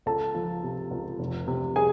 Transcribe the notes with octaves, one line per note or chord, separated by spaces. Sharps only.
C#2 A4 A5
F3
C3
C#2
F1
C3
G#4 G#5